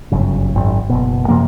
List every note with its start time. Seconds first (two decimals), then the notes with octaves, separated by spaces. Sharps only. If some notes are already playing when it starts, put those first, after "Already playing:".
0.12 G1 F#2 C#3
0.56 G#1 F#2
0.89 F#1 B2
1.28 F#2 C3 F3 A#3